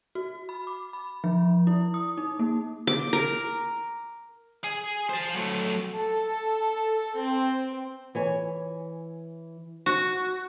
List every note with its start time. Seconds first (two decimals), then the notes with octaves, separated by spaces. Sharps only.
0.15 F#4
0.49 B5
0.67 D6
0.93 B5
1.24 F3
1.67 E4
1.94 D#6
2.17 D#4
2.39 A#3
2.87 D6
3.13 A#4
4.64 G#4
5.09 C5 A5
5.34 F#3 A3
5.97 A4
7.20 C4
8.15 E3 C#5 G#5
9.86 F#4